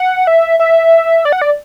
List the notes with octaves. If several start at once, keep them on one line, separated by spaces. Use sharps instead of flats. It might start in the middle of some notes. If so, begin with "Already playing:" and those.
Already playing: F#5
E5
E5
D5
F#5
D5